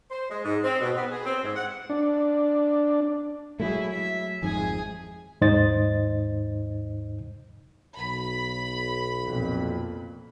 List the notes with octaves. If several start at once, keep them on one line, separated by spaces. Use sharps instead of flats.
C5
G#3
G#2
C4
B2
B3
G#4
C4
G#2
F#5
D4
F#3 G#3 A3 E4 G#4
E5
G#1 F2 G#2 G#4 G#5
D#2 G#2 D#4 C5 D#5 A6
B1 B5
F2 A#2